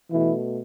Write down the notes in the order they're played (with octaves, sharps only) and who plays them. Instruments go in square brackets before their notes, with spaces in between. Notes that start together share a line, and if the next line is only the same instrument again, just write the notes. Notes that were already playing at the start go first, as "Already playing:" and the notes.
[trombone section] B2 E3 A3 E4